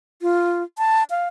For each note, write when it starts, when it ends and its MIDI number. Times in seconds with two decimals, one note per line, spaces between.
0.22 0.63 65
0.78 1.03 81
1.10 1.28 77